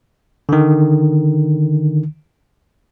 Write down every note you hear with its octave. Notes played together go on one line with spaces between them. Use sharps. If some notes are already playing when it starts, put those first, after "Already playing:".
D3 D#3